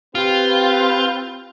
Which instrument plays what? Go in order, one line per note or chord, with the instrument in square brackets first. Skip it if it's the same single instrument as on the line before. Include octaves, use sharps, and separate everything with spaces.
[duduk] C4 [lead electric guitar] F4 [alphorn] G4 [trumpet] B4